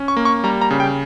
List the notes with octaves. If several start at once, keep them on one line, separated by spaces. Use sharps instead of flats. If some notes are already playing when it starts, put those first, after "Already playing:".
Already playing: C#4
C#6
A#3
C#6
G3 A#5
A#5
C#3
G5